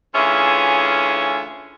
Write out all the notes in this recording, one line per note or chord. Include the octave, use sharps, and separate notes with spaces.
D2 E3 C#4 F4 G#4 E5